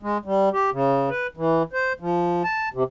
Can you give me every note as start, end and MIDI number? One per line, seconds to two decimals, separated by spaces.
0.03 0.18 56
0.25 0.49 55
0.53 0.70 67
0.72 1.09 49
1.10 1.27 71
1.37 1.63 52
1.73 1.93 72
2.00 2.43 53
2.44 2.69 81
2.74 2.83 48